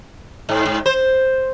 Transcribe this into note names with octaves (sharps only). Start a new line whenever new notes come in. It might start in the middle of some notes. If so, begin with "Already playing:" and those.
G#2
G#2
C5